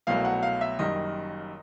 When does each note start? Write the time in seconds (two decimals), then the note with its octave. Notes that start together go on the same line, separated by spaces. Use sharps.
0.07 C2 B2 F#3 A3 F5
0.25 F#5
0.43 F5
0.61 E5
0.79 F#1 F#2 D#3 G3 D#5